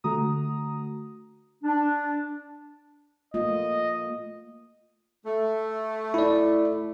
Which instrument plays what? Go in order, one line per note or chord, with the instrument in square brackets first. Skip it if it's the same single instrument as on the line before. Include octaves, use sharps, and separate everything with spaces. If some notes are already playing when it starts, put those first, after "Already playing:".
[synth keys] D3 A3 F#4 A#5 D#6
[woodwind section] D4
[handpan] A3 A#3 F4 [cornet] D#5
[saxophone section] A3
[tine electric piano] E4 D5